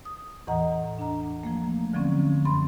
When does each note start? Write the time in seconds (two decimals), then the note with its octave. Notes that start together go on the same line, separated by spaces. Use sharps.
0.05 D#6
0.47 E2 A2 E3 D#5 F#5 A#5
0.99 D4 A#5
1.43 F3 A3 A#3
1.93 D3 F3 F#3 C4 C#4
2.45 F#2 C4 B5 C6